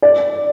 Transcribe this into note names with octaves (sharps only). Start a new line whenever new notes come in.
D5